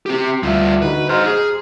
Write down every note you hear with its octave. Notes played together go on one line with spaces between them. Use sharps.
C4 G4
D2 G3 F4 E5
D3 D#4 F#4 B4
C5 D#5 A#5 C6 F6
G#4